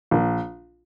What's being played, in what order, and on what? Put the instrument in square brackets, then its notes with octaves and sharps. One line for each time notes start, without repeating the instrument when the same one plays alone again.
[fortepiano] A#1